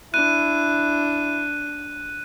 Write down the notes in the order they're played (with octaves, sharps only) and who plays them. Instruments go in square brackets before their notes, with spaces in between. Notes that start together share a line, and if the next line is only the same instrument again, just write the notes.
[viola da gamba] D4 [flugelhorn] E4 [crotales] F#6 D#7